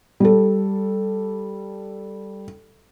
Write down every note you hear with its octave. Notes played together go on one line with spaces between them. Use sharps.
G3 A4